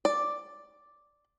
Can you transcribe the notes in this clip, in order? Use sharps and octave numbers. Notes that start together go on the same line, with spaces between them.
D5